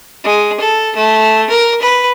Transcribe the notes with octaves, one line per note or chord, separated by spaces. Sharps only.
G#3
A4
A3
A#4
B4